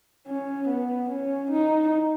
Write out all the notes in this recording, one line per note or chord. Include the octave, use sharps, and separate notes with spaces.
C#4
B3
C#4
D#4